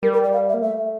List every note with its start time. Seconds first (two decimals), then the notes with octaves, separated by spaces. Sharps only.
0.02 G3 A#4
0.13 A#4
0.23 D5
0.32 F5
0.48 E5
0.54 A#3
0.62 A3 E5